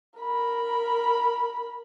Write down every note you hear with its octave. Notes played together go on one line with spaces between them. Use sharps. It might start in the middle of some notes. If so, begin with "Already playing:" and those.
A#4 B5